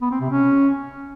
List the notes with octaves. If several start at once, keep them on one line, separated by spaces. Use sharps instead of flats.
B3
C4
C3
C#4